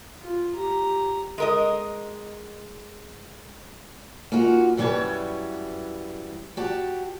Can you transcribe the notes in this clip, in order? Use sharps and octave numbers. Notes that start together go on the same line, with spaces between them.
F4
G4 A#5
G#3 A#4 D#5
A#3 C#4 D#4 F4 F#4
F#2 E3 G3 B3 C#5 A5
F#4 G4 A5